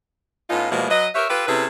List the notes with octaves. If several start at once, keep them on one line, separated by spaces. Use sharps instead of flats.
A2 B3 C#4 D#4 F4
B2 E3 F3 G3 G#3 A#3
F#3 B4 D#5
G4 A#4 B4 C#5 E5
F4 G4 A4 B4
C3 C#4 E4 G#4 A4 B4